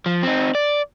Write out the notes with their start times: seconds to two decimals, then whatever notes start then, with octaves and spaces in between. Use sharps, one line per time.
0.06 F3
0.23 C4 D#4
0.55 D5